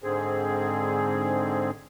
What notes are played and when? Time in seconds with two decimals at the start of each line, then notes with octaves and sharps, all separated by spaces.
0.03 G#2 D3 C4 G#4